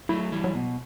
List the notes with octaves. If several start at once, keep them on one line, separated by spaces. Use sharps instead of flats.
F#3 A3 E4
E3 G3
F#3
B2